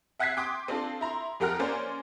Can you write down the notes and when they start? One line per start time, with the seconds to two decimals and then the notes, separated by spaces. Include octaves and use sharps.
0.19 E5 F#5 F#6 G#6 B6 C7
0.37 G5 C6 D6 D#6
0.68 C4 D4 F4 A4
1.01 E4 A#5 C6
1.40 F2 G4 A#4 F#5 A#5 F6
1.59 A#3 C#4 C5 D5 G#5